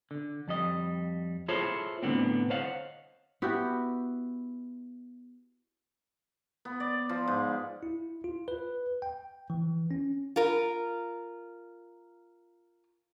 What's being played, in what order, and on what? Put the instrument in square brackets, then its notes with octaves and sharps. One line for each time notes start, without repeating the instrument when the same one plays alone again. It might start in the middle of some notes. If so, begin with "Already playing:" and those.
[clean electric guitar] D3
F2 G3 D#5
E4 F4 G#4 A4 C5 C#5
C2 A2 D3 B3 C4
C5 C#5 D#5 F5 F#5
[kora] B3 E4 F#4 G4
[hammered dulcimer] B3
D5
F3
G#2
[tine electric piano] E4
F4
B4
G5
E3
C#4
[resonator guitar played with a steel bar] F4 A#4